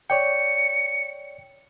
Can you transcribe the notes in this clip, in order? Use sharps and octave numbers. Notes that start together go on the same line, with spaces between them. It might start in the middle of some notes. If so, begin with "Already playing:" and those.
C#5 D5 G5 C#7